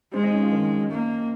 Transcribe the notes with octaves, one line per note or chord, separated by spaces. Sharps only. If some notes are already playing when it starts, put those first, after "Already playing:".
G#3 C4 C5
D#4 D#5
C#4 C#5
F3 F4
D#3 D#4
A#3